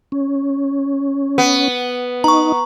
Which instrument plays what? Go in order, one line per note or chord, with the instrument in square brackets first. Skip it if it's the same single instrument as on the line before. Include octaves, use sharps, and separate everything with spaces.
[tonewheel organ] C#4
[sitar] B3
[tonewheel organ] D#4 [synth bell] A#5 C#6